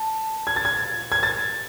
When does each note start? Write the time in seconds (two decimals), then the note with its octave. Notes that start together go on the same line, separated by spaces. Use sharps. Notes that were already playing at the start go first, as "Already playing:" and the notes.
Already playing: A5
0.47 G#6
0.56 A6
0.65 G#6
1.12 G#6
1.23 A6